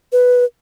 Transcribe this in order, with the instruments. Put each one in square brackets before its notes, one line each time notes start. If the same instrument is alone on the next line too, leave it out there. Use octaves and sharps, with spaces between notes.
[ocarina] B4